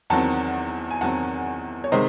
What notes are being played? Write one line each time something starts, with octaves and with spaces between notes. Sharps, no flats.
E2 D#3 F#3 C4 F#5 A5
G#5
E2 D#3 F#3 C4 F#5 A5
C#5
C3 D#3 G#3 C5 D#5